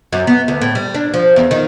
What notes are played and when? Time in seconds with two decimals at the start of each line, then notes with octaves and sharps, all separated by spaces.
0.13 F#2
0.27 B3
0.48 D2
0.62 A2
0.75 G3
0.94 D4
1.14 F3
1.36 E2
1.51 D#3